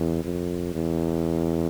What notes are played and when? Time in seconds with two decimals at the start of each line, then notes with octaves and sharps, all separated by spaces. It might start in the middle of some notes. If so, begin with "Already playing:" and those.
Already playing: E2
0.24 F2
0.74 E2